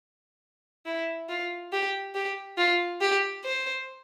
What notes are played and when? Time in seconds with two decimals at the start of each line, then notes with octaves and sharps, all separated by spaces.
0.86 E4
1.29 F4
1.72 G4
2.15 G4
2.57 F4
3.01 G4
3.44 C5